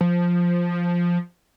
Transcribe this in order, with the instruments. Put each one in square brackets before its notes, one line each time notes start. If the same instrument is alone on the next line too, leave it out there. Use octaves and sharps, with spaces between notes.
[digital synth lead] F3